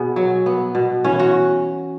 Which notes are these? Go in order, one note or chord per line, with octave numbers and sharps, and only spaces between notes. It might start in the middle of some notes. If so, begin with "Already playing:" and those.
Already playing: B2 B3 G#4
F#3
B3
B2
E3 C#4
F#4